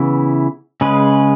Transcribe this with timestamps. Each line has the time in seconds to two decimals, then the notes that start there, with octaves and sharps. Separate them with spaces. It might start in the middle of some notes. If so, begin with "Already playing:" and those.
Already playing: C#3 E3 B3 E4
0.81 C#3 G#3 C#4 G#4 B4